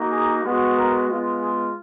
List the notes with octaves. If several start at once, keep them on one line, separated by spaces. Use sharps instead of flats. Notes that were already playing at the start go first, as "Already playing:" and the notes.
Already playing: A#3 D#4 F#4
G#4
G#3 B3 F#4
A#4
G#3 B3 F4
G#4